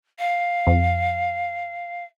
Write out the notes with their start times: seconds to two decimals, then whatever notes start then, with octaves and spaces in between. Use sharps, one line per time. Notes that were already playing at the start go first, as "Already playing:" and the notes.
0.19 F5
0.67 F2